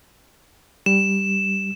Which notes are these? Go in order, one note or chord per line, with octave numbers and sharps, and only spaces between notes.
G3 E7